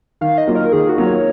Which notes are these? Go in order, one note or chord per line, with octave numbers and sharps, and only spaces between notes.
D#3 F5
D#5
F#3 A#3 F4
A#4
D#3 G#4
F#4
F#3 A#3 F4
C#5